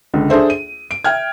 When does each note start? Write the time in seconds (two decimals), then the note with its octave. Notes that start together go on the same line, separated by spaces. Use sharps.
0.14 C#2 D3
0.30 D4 G#4 A4 C5 E5
0.50 D#7
0.91 D7
1.04 E5 G5 F6 G#6